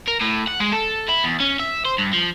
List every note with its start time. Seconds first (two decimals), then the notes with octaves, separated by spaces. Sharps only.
0.08 A#4
0.21 A2
0.47 F#5
0.60 G#3
0.72 A4
1.08 E4
1.24 E2
1.40 C#4
1.60 E5
1.85 C5
1.98 G2
2.13 F3